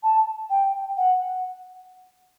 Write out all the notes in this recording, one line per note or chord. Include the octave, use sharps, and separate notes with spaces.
A5
G5
F#5